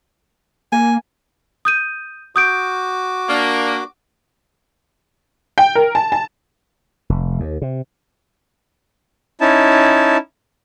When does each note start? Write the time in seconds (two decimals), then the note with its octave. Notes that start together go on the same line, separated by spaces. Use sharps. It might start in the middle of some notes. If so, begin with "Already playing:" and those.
0.72 A#3 G#5
1.65 D#6 G6 D#7
2.36 F#4 D6 D#6 G6 D7
3.29 A#3 D4
5.58 G5
5.75 A#4
5.95 A5
6.12 A5
7.10 F1
7.40 D#2
7.62 C3
9.41 C#4 D#4 E4 A5